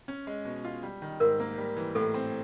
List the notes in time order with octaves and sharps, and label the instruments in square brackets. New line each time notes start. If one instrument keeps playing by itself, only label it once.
[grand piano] C#4
G#3
B2
F4
G3
D#3
[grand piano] G#2 [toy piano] A#4
[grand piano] A#3
G3
E3
[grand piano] A2 [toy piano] A4
[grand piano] C4